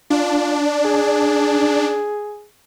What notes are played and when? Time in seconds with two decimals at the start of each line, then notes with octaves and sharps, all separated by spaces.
0.10 D4 F4
0.85 G#4